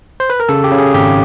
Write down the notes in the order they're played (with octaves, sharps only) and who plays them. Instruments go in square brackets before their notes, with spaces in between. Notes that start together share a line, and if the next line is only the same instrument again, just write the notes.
[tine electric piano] C5
B4
A#4
C#3 A4
G4
C#3
G#4
G#1 G4